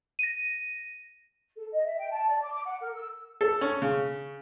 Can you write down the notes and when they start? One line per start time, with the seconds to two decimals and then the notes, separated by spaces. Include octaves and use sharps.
0.19 A#6 D#7
1.56 A4
1.71 D#5
1.85 E5
1.99 G5
2.11 A5
2.28 D5
2.40 D6
2.52 D6
2.65 F#5
2.81 A#4
2.95 E6
3.41 A4
3.61 C#4
3.82 C#3